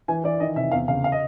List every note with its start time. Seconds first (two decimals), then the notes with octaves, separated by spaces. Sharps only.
0.08 E3 G#5
0.24 E3 D5
0.40 D#3 D#5
0.56 C3 E5
0.72 E2 F5
0.88 C#3 F5
1.04 F5
1.12 D#5